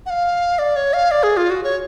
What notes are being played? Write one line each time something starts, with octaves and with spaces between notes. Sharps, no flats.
F#5
F5
D5
C#5
F5
D5
G#4
F4
F#4
C#5